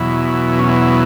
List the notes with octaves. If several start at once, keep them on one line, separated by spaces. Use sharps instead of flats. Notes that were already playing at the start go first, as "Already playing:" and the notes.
Already playing: E2 B2 F#3 E4
C#4
E4